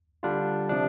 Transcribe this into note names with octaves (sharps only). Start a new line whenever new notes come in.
D3 G3 D4 F4
C3 F3 D4